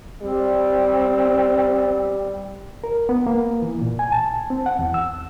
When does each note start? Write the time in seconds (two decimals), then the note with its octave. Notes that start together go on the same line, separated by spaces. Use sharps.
0.23 G3 C4
2.84 A#4
3.09 B3
3.27 A#3
3.62 E3
3.81 A#2
3.99 G#5
4.12 A5
4.50 C4
4.66 F#5
4.79 E2
4.94 E6